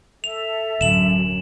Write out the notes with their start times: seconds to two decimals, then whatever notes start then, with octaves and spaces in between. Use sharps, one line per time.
0.24 A4 E5 F7
0.81 D1 F#2 E7 F#7